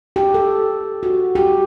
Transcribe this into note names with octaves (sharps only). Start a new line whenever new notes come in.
G4
A4
F#4
G4